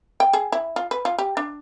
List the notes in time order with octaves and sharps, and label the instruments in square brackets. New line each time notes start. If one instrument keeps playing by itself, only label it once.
[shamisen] G5
G#4
E4
F4
B4
F4
G4
D4